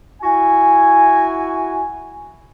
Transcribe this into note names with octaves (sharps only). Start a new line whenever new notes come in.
E4 F#4 G#5